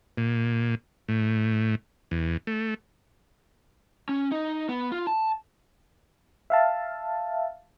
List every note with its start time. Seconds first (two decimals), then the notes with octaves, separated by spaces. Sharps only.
0.18 A#2
1.09 A2
2.11 E2
2.47 A3
4.09 C#4
4.32 D#4
4.69 B3
4.92 F4
5.07 A5
6.50 E5 F5 A5